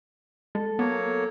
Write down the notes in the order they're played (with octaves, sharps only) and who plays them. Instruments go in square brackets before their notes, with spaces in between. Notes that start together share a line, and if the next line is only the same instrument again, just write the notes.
[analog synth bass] G#3 [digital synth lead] A4
[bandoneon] F#3 A#3 C#5 [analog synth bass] B3